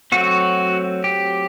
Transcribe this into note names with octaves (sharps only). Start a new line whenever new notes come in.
F#3 A3 C4 F#4
G4